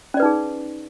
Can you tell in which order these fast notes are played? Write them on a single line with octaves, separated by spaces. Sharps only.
C#4 D5 B4 D#4 G#4